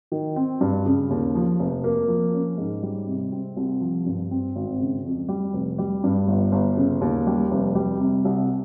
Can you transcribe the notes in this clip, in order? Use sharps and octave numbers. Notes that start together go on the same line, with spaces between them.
D#3
C4
G2
C#3
D#2
F3
F1
A#3
F3
C#4
G#2
G3
C3
C4
C2
F3
G2
C4
G#1
C#3
F2
G3
F1
G3
G2
G1
G1
C#3
D#2
G3
F1
G3
C3
C2